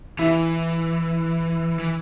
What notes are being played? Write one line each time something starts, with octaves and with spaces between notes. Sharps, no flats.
E3 E4
E3